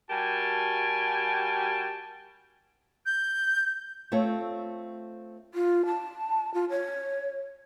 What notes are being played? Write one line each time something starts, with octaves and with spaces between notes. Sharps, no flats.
G3 F#4 G4 A#4 G#5 A5
G6
A3 C4 F4 A4 C#5
F4
A5
F4
C#5